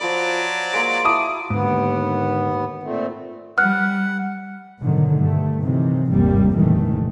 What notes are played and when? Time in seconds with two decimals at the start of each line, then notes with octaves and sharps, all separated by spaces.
0.01 F3 F#3 B4 D5 D7
0.73 G#3 A#3 C5 D7
1.05 E4 F#4 A5 D6 D#6
1.50 D#2 G#2 D3 B3
2.83 A#2 A3 C4
3.58 G3 F#5 F6 F#6
4.80 G#2 B2 D3 D#3 F#3
5.17 G2 A3
5.62 C3 D#3 E3 F#3
6.10 G1 D#2 G#2 C3 G3 A#3
6.56 F1 C#2 A#2 D#3 E3 A3